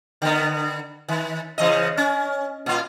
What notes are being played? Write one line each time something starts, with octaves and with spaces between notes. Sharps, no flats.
D3 B3
D#3
C#3 E3 D#5
C#4
A#2 F4